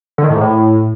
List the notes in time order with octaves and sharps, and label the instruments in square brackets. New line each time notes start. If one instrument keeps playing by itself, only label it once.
[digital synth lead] D3
D#3
A2
G#2
A2